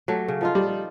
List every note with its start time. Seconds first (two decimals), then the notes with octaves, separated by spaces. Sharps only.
0.08 F#3 A3 G4
0.28 C#3
0.41 F3 D#4 F4
0.55 G3